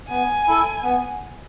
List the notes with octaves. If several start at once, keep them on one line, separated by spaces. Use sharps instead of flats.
B3 G#5
E4 A4
B3